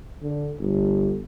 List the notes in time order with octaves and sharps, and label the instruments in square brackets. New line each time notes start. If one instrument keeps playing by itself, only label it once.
[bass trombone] D3
G1